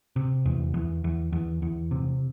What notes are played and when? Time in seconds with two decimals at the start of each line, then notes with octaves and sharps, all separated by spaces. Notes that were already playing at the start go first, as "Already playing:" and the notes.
0.16 C3
0.45 E2
0.74 E2
1.04 E2
1.32 E2
1.62 E2
1.91 C3